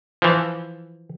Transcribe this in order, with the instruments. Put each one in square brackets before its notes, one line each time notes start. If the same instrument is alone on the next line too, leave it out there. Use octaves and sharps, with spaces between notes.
[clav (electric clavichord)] E3 F3